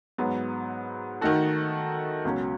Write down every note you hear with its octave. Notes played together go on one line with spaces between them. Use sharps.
G#2 F#3 B3
D#3 A3 D#4 F#4 A4
C#2 B2 F#3 C#4